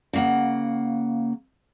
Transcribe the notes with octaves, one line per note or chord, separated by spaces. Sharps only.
C#3 A#3 F#5